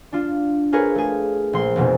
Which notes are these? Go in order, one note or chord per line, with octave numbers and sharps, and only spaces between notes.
D4 F4
F4 G#4 A#4 B4 C#5
A3 G#4
A#1 C6
F1 A#1 B2